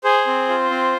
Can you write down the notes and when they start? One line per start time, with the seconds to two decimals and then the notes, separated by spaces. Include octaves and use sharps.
0.04 G#4 C5
0.27 C4
0.49 F4
0.70 C4